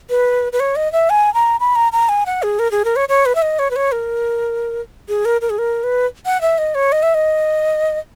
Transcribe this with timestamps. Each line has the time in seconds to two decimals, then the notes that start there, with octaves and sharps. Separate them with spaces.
0.10 B4
0.52 B4
0.60 C#5
0.76 D#5
0.92 E5
1.10 G#5
1.34 A#5
1.60 B5
1.75 A#5
1.92 A#5
2.09 G#5
2.26 F#5
2.43 G#4
2.59 A#4
2.71 G#4
2.85 A#4
2.96 C#5
3.09 C#5
3.26 B4
3.35 E5
3.42 D#5
3.59 C#5
3.71 B4
3.76 C#5
3.92 A#4
5.09 G#4
5.25 A#4
5.41 A#4
5.50 G#4
5.58 A#4
5.83 B4
6.26 F#5
6.41 E5
6.58 D#5
6.75 C#5
6.92 D#5
7.03 E5
7.14 D#5